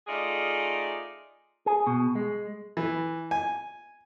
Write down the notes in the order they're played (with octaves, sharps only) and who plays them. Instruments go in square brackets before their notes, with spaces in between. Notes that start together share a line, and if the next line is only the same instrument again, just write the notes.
[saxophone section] A3 D#4 F4 G#4 D5
[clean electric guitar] G#4
B2
G#3
[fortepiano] E3
G#5